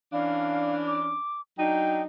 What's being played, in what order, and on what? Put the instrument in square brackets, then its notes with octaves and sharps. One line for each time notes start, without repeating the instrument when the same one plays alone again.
[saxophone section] E3 C#4 D4 [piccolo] F5
[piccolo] D6
[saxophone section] F#3 D4 D#4 [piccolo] G5